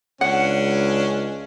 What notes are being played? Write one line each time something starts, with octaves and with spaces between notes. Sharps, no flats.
C#2 C#4 D4 F#5